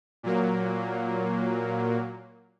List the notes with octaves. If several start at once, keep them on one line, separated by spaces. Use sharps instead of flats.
A#2 F#3 A#3